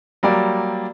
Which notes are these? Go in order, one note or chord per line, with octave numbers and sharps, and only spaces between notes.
F#3 G3 A#3 G4 D5